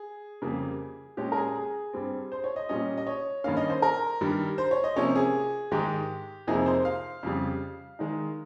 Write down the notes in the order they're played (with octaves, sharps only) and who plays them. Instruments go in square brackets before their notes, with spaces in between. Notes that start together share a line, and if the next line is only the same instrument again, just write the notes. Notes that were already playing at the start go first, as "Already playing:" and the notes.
Already playing: [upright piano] G#4
F2 C#3 G3 A#3
A#2 G#3 C#4 G4
A#4
G#4
G#4
G2 G3 C4
C5
C#5
D#5
A#2 G3 C#4 D#5
D#5
C#5
G2 D#3 A#3 C#4 F5
D#5
C5
A#4
G2 D#3 G3
C5
C#5
D#5
C3 F3 A#3 C#4 C#5
G#4
G#2 D#3 G#3 G4
F2 C3 F3 A#3 D#4 G#4
C5
F5
F2 C#3 G3
D#3 G#3 D#4